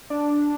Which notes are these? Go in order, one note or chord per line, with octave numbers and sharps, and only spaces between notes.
D4